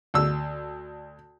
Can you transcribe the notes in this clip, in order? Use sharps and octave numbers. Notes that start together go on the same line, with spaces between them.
D2 E6